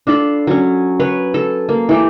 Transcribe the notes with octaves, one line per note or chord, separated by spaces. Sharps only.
D4 F4 A4 B5
F#3 C#4
B4 C#5
A4
A#3
E3 A3 G4